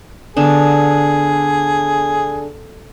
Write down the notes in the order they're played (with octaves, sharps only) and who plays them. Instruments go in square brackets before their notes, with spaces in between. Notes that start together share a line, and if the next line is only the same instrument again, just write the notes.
[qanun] D3 B3 D4 [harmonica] G#4